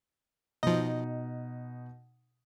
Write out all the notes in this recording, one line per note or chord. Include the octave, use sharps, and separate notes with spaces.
B2 F3 D#4 D#5